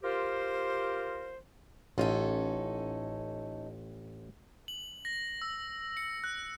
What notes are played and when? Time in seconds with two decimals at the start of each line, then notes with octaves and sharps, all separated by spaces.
0.03 F4 G4 A#4 C5
1.98 A1 C#4 D#4 F4 A4
4.68 F#7
5.05 A#6
5.42 E6
5.97 C#7
6.24 F#6